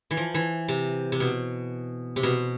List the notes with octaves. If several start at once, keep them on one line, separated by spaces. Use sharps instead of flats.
E3
F3
E3
C3
C3
B2
C3
B2